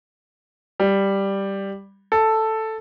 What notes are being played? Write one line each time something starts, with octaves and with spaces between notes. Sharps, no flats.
G3
A4